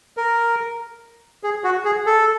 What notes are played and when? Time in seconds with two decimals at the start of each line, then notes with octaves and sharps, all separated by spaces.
0.17 A#4
1.44 G#4
1.64 F#4
1.85 G#4
2.06 A4